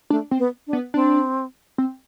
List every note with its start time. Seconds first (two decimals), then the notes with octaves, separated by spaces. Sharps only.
0.10 A3 D4
0.31 C4
0.39 B3
0.67 D4
0.73 B3
0.94 C4 D4
1.78 C4